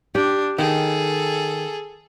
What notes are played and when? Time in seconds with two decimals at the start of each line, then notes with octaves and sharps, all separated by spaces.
0.15 D4 G4
0.59 D#3 G#4 A4